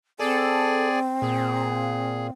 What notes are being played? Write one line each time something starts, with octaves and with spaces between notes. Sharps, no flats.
C4 G#4 A4 D5 G#5
A#2 G#4